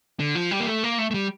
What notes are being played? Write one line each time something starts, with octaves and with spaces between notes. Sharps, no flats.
D3
F3
G3
A#3
A3
A#3
A3
A3
G3